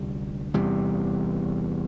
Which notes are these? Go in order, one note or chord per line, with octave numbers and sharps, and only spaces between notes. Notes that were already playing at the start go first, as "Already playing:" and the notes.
Already playing: D2 C3 G3
E2 C3 G3